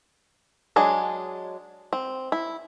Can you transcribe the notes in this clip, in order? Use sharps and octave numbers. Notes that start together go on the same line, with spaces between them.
F#3 G#3 D4 G#4
C4
E4